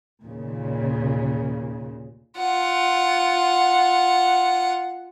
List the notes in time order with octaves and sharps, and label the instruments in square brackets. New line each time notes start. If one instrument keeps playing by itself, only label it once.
[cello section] D#2 A#2 C#3
[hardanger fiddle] F4 F#5